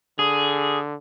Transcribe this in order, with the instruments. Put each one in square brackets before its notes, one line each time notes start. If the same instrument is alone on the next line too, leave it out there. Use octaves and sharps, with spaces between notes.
[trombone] D3 [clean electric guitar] G#4